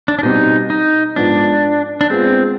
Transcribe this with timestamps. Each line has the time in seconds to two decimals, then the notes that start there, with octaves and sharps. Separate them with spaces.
0.08 D4
0.19 D4
0.23 B2 G3 C4 D#4
0.70 D#4
1.16 G#2 F3 B3 D4
2.01 D4
2.10 G#3 B3 C4 F4